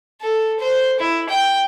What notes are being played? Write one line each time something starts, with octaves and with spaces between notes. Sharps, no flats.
A4
C5
E4
G5